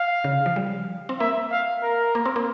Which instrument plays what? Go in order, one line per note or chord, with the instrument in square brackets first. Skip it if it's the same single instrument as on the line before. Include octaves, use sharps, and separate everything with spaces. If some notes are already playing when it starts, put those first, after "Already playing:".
Already playing: [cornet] F5
[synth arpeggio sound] C#3
F3
G3
C4
[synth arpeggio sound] A#3 [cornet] E5
[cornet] F5
A#4
[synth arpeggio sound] A#3
C4
A#3